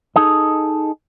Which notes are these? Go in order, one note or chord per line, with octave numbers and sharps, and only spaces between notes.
D#4 G#4 A4 D#5